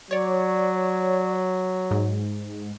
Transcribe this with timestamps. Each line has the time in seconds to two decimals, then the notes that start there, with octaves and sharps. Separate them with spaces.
0.11 F#3 C#5 D5
1.91 G#2